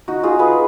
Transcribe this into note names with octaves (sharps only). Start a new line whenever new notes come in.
D#4 F#4
F4 G#4
G#4 B4